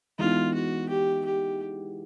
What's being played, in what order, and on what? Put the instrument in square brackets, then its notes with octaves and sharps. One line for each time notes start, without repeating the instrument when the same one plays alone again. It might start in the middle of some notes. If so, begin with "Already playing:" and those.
[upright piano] E3 G#3 B3 D#4 [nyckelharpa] F4
[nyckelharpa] F#4
G4
G4